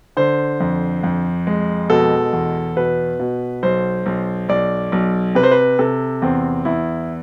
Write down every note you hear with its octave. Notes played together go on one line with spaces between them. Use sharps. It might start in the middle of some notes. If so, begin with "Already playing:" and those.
D3 C5
F2
F2
G#3
B2 A4
E2
B2 B4
B2
B1 C5
B1
B1 D5
B1
C3 B4
C5
B4
C3 A4
E2 C4
E2 E4